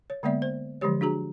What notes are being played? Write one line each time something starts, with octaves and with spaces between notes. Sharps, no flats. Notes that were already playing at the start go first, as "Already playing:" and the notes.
C#5
D3 G#3 A#3 B3 D5 E5
C5
D3 F3 F#3 G#3 G4 C#5
D4 F#4 G#4 A#5